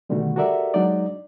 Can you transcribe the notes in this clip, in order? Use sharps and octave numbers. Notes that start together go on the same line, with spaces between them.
B2 D3 D#3 G3 A3 F#4
F#4 G4 A4 A#4 D5 E5
F#3 G#3 D4 D#4 D5 D#5